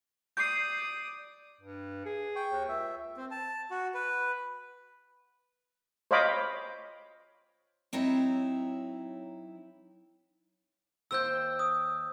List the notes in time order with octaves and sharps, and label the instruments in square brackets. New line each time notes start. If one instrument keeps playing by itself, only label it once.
[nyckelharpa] D5 D#6 [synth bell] G6 C7
[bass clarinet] G2
G#4
[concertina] G5 C#6
[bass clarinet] D#2
[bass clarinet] C#2 [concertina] E5
[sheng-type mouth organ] C4
A5
F#4
B4
[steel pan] C5 C#5 D#5 F5 B5 D6
[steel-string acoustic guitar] F#3 C4 D#4 E4 C#5
[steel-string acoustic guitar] D#2 C5 G5 [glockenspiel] E6 G6
[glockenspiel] D#6